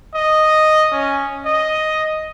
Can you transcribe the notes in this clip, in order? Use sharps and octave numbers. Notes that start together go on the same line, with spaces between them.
D#5
C#4
D#5